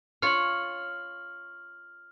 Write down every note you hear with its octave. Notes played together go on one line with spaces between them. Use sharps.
F4 C#5 F6 F#7